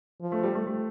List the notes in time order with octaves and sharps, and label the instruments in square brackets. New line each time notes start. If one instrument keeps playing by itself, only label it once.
[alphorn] F3
[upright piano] A3
G3
A3
A3